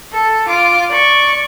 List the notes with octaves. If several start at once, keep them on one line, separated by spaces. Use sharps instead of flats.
A4
F4 D6
D5 C#6